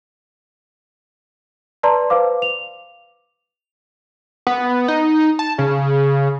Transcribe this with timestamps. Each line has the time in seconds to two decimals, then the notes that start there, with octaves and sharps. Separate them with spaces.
1.83 B4 D5 A5 A#5 C6
2.10 B4 C5 F5 D6
2.42 F7
4.47 B3
4.88 D#4
5.39 A5
5.58 C#3